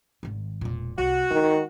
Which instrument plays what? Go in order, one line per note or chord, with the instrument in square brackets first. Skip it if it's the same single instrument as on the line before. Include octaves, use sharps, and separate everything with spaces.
[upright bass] G#1 D#3
E1 A#2
[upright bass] C2 [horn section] F#4
[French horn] D#3 [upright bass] G#3